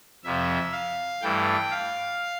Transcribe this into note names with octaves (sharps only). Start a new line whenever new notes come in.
F2 C3 F3 E5
F5
G2 E3 A3 G5
F5